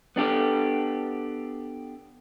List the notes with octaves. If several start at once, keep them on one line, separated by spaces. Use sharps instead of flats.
B3 D4 G4 A4